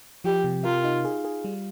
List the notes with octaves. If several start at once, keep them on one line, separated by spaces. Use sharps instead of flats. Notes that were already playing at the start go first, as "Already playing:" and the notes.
F3 G4
C3
F4 A#4
D#4
G#4
G#4
G3